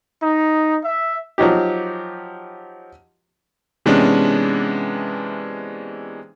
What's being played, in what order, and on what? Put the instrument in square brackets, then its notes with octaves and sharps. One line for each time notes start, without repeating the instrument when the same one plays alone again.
[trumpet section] D#4
E5
[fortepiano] F3 F#3 D#4 G4
[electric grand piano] C3 E3 G#3 B3 C#4 D4